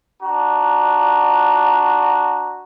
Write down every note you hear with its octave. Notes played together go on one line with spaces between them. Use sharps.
D4 F#4 A#5